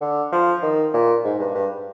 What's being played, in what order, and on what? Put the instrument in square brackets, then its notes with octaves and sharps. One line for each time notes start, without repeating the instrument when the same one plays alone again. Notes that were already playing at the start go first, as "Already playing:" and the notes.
[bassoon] D3
F3
D#3
A#2
G#2
G2
G2